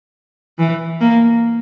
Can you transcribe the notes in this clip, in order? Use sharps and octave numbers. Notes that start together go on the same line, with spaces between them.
E3
A#3